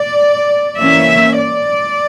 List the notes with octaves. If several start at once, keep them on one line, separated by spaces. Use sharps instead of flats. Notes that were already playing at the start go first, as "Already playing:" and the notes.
Already playing: D5
E3 A#3 C#4 E5
D5